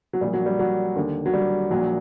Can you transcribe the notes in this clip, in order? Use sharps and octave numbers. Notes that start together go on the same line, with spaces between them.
F#3
A#1 A#2 G3
F#3
G3
F#3
D#2 D3
F#3
G3
A#1 A#2 F#3